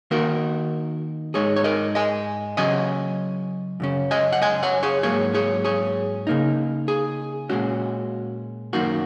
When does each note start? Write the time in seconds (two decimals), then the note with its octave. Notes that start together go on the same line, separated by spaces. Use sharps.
0.11 D#3 A#3 D#4 F#4 A#4
1.34 G#2 G#3 D#4 G#4 C#5
1.56 C#5
1.64 A#4 D#5
1.95 D#5 G#5
2.57 C#3 F#3 C#4 D#5 G#5
3.80 F#2 C#3 C#4
4.11 D#5 G#5
4.33 F#5
4.42 D#5 G#5
4.63 C#5 F#5
4.83 G#4 C#5
5.03 G#2 F#3 A#3 G#4 C#5
5.34 G#4 C#5
5.64 G#4 C#5
6.27 C#3 A#3 D#4
6.88 G#4
7.49 A#2 G#3 C#4 F#4
8.73 F#2 D#3 A#3 F#4